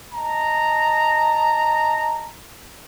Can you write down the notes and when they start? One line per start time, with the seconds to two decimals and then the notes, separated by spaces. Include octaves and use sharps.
0.14 D#5 A5 A#5